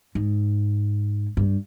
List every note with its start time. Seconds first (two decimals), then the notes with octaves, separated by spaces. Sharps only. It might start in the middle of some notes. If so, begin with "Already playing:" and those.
0.15 G#2
1.37 G2